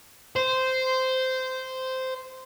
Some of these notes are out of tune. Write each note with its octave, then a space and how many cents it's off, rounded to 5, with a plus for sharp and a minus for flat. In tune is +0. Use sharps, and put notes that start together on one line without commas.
C5 -10